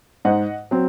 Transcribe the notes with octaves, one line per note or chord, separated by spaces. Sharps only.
G#2 D#5 F#5
F#3 C4